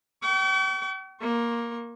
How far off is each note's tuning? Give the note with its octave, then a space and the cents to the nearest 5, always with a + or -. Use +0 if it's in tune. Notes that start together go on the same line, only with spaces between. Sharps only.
G5 -40 C#6 +40
A#3 +10 C#6 -40